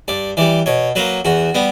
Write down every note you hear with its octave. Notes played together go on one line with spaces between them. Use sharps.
G2 D5
E3 G3 D5
B2 C#5
F#3 A#3 B4
E2 F#4
G3 B3